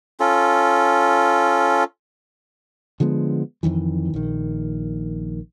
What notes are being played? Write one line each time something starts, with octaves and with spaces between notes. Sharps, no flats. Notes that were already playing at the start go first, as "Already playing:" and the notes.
C#4 F4 A4
D3 F3 G#3 B3
F2 C3 D#3 E3
A#1 D#3